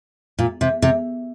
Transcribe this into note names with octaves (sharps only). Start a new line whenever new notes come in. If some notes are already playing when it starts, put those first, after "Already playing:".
A#2
C3
C3